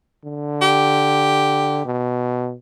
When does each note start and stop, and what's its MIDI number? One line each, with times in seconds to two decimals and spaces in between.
0.24 1.84 50
0.61 1.86 67
1.85 2.54 47